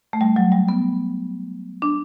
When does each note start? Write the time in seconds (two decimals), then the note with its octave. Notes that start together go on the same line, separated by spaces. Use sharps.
0.13 A3
0.21 G3
0.36 F#3
0.52 G3
0.69 B3
1.82 D4